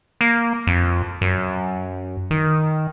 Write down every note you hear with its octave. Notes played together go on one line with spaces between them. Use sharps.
A#3
F2
F#2
D#3